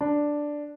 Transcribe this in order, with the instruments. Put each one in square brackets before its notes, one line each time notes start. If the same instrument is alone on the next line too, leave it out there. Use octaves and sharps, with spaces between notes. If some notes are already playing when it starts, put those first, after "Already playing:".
[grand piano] D4